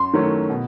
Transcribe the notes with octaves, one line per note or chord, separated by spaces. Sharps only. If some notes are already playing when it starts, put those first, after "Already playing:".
Already playing: F#2 C6
D#3 F#3 A3 C#4
B2